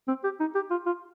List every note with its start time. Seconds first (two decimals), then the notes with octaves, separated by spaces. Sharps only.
0.08 C4
0.24 G4
0.40 D#4
0.55 G4
0.71 F4
0.86 F4